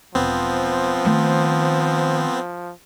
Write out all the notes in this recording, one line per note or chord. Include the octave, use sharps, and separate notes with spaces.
E1 F3 B3 C4
D#3 A3